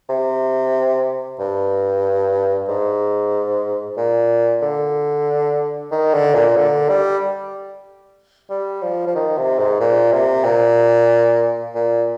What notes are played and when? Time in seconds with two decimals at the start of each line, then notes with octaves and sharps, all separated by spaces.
0.09 C3
1.39 G2
2.68 G#2
3.97 A#2
4.62 D3
5.91 D#3
6.14 D3
6.34 A#2
6.57 D3
6.89 G3
8.50 G3
8.82 F3
9.07 F3
9.15 D#3
9.37 C3
9.59 G#2
9.80 A#2
10.12 C3
10.45 A#2
11.75 A#2